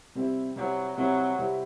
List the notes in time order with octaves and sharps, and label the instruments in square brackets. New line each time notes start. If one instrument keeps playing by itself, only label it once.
[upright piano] C3 G3 C4 E4
[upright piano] C3 G3 C4 E4 [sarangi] F#3
[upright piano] C3 G3 C4 E4 [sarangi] F#3
[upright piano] C3 G3 C4 E4